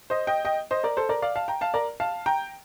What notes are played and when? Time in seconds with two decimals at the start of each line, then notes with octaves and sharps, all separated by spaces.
0.10 C5 D#5
0.27 D#5 G5
0.45 D#5 G5
0.71 C5 D#5
0.84 A#4 D5
0.97 A4 C5
1.09 A#4 D5
1.22 D5 F5
1.35 F5 A5
1.48 G5 A#5
1.61 F5 A5
1.74 A#4 D5
2.00 F5 A5
2.26 G5 A#5